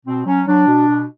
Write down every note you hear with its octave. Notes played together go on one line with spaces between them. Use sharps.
B2 C4
F#3 C#4
F#3 D4
B2
B2